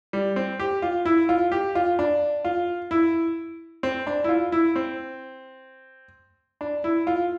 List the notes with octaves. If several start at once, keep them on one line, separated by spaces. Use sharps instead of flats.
G3
C4
G4
F4
E4
F4
G4
F4
D4
F4
E4
C4
D4
E4
F4
E4
C4
D4
E4
F4